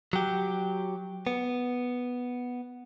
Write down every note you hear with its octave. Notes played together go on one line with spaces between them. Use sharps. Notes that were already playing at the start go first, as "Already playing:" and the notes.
F#3 G4
B3